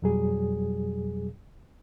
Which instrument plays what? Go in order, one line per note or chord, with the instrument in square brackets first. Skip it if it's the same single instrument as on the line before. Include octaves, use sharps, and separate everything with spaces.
[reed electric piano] F2 B2 F#3 G3 G#4